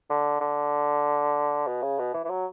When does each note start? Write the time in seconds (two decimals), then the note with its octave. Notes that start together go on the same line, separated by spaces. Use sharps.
0.10 D3
0.41 D3
1.67 B2
1.82 C#3
1.99 B2
2.14 E3
2.25 E3
2.30 F#3